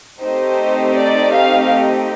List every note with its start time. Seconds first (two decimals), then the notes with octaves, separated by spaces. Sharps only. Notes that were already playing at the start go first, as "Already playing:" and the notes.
0.21 A3 C4 D#4 G4 C5
0.96 D5
1.32 F5